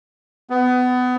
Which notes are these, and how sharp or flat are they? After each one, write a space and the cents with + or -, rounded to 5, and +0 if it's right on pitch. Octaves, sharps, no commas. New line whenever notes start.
B3 +25